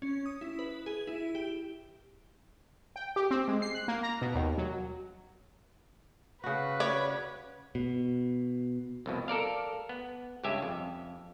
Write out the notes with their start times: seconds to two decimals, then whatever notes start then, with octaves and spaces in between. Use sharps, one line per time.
0.02 C#4
0.26 D#6
0.41 E4
0.59 B4
0.86 G#4
1.07 E4
1.35 G4
2.96 G5
3.16 G4
3.31 C4
3.48 G#3
3.62 C7
3.74 F#6
3.88 A#3
4.03 A#5
4.21 B2
4.35 D#2
4.58 F#3
6.44 C#3 F#4 B4
6.80 C#5 D5
7.75 B2
9.06 C2 F2 B2
9.28 A4 A#4 D5 F5
9.89 B3
10.43 C#2 G2 C#3 G4 E5 G#5
10.62 F2